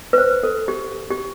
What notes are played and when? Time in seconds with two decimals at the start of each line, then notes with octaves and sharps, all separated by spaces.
0.13 B4
0.18 C5
0.43 A4
0.68 G4
1.10 G4